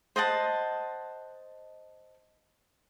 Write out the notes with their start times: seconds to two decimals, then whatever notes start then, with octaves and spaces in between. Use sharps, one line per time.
0.16 C5 D#5 F#5 A5